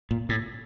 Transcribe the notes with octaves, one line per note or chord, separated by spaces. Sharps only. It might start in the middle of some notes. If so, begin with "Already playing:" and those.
A#2
A2